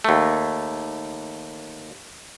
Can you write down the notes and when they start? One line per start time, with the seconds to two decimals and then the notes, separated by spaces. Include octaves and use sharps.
0.04 D#2 A3